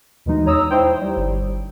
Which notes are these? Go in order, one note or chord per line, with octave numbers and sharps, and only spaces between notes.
D#2 B2 E3 G#3 D#4
E2 C#5 A#5 D#6 E6
D#4 E4 C5 C#5 G5
G3
G1